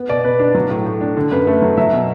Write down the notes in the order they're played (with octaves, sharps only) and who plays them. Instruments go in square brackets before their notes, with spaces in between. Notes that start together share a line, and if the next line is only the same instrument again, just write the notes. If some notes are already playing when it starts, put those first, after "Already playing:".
Already playing: [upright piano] B3
B2 D5
B2 B4
D4
F#3
A2
A2
D4
D3
F#2 B4
A3
F#3
F#3 E5
B2